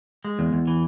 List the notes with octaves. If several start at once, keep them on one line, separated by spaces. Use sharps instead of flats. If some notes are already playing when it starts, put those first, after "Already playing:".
G#3
E2
E2
E3